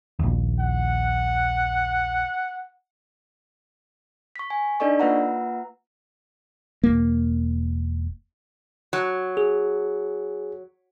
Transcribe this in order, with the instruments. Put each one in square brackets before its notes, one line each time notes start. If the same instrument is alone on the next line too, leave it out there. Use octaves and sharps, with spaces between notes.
[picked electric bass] A#1 D#2
[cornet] F#5
[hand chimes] C#6 B6
G#5
D4 D#4 A4 D5 D#5 C#6
A#3 F4 B4 E5 F#5 A#5
[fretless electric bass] E1 E2 A#3
[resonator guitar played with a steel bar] F#3
[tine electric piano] G#4